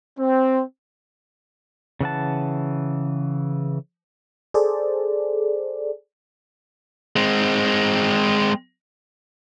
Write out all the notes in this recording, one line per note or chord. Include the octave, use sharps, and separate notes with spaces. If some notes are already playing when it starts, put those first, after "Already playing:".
C4
C#3 E3 F#5 A5
G#4 A4 C5 D5
G#3 C4